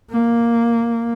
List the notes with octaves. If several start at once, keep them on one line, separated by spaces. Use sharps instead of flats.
A#3